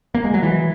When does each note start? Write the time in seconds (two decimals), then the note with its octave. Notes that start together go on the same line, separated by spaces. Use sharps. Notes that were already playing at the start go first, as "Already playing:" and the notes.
0.15 A#3
0.25 G#3
0.34 F#3
0.43 E3